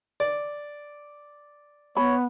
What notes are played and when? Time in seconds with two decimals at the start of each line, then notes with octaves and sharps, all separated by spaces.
0.20 D5
1.97 B3 C#5 B5